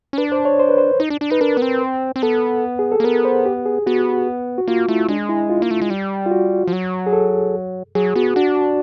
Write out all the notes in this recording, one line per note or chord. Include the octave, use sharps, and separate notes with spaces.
C#4
D4 B4
C5
C#5
C5
B4
C5
D#4
D4
D4
D#4 B4
D4 A#4
B3
C4
C4
B3 A4
G#4
A4
A#3
B3 A#4
C5
G4
G#4
B3 F#4
F#4
A#3 F4
A3 E4
G#3 D4
E4
F4
A#3
A3
G#3
G3
F4
F#4
F3
F#3
G#4
A4
F#3 G#4
B3 F#4
D4 F#4